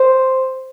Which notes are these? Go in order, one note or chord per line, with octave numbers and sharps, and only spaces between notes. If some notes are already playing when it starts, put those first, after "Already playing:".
Already playing: C5